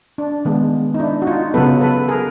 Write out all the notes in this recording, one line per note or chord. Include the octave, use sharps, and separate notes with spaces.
D4
D#3 G#3 B3
D#4
D4 E4
F#4
D#4 F4
C#3 F#3 B3 A4 B4
A4 B4
G#4 A#4